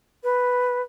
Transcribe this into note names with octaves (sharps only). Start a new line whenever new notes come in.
B4